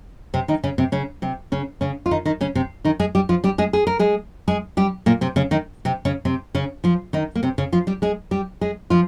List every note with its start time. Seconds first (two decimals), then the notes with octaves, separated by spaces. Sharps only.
0.34 C3 C4
0.48 D#3 D#4
0.63 C#3 C#4
0.78 C3 C4
0.92 C#3 C#4
1.22 C3 C4
1.52 C#3 C#4
1.81 C#3 C#4
2.06 F4
2.11 D#3 D#4
2.25 D#3 D#4
2.41 C#3 C#4
2.55 C3 C4
2.85 D#3 D#4
2.99 G#3 G#4
3.15 G3 G4
3.29 F3 F4
3.44 G3 G4
3.58 G#3 G#4
3.73 G#4
3.87 A#4
3.99 G#3 G#4
4.48 G#3 G#4
4.77 G3 G4
5.06 A#2 A#3
5.21 C3 C4
5.36 C#3 C#4
5.51 D#3 D#4
5.85 C3 C4
6.05 C#3 C#4
6.25 C3 C4
6.55 C#3 C#4
6.84 F3 F4
7.13 D#3 D#4
7.35 A#3
7.43 C3 C4
7.58 C#3 C#4
7.72 F3 F4
7.87 G3 G4
8.02 G#3 G#4
8.31 G3 G4
8.61 G#3 G#4
8.90 F3 F4